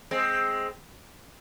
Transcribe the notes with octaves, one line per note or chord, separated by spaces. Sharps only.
G#3 C4